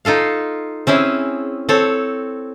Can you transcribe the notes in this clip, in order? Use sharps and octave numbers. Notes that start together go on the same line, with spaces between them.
D#4 F4 A4 F5
C4 C#4 E4 G#4
C4 A4 C#5